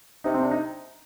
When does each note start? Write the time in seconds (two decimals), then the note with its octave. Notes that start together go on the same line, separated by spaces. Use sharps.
0.24 C3 D#4
0.34 C4
0.43 D4
0.51 D#4